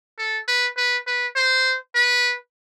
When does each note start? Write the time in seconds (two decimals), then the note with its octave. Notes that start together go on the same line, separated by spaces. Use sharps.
0.18 A4
0.48 B4
0.77 B4
1.07 B4
1.36 C5
1.95 B4